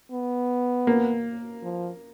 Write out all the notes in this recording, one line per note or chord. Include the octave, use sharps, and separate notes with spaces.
B3
A#3
F3